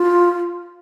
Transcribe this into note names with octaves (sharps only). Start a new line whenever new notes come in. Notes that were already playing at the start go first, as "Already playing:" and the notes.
Already playing: F4